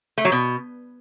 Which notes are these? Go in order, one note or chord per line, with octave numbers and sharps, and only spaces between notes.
A3
F#3
B2